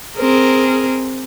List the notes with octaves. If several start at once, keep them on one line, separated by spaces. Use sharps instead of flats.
C4 G#4 A#4